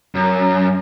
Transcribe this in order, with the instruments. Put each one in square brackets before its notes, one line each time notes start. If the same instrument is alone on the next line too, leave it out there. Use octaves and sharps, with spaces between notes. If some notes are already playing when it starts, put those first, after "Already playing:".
[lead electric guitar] F#2